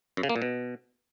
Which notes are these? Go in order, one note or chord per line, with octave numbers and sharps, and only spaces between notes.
F#2
C#3
A#3
A#2
B2